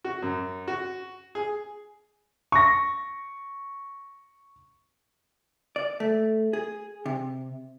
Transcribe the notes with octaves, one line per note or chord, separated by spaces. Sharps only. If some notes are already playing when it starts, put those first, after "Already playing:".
F#4
F#2
F#4
G#4
C#6 A#6
D5
A3
G#4
C3